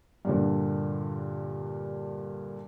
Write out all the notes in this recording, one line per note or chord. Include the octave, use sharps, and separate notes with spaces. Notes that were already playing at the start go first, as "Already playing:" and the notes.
G2 A#2 D3